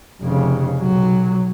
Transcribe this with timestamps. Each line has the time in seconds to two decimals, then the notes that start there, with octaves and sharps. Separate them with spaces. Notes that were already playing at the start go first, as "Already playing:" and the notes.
0.21 F1 C#3
0.80 B1 F#3